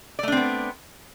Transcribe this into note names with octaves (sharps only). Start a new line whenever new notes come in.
A3 B3 C4 D4 D5